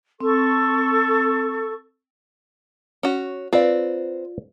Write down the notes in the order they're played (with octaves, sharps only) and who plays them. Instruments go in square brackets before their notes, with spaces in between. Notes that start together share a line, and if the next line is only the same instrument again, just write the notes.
[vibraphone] C4 [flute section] A4 C#6
[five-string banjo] C#4 F#4
[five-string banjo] C4 B4 [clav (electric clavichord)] F4 D5